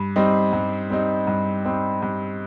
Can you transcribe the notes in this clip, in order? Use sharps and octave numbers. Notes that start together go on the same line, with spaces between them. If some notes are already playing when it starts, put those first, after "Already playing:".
Already playing: G2
G3 C4 D#4
G2
G3 C4 D#4
G2
G3 C4 D#4
G2